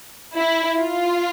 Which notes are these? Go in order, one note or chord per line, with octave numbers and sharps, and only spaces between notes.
E4
F4